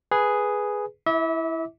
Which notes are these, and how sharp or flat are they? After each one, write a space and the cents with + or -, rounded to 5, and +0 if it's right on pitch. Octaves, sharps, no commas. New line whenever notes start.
G#4 +0 B4 +0
E4 +0 E5 -35 D6 -20